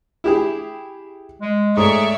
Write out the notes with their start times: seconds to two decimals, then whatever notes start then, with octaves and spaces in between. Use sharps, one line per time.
0.24 E4 G4 G#4
1.41 G#3
1.77 G#2 A3 G#4 C#5 D5 E5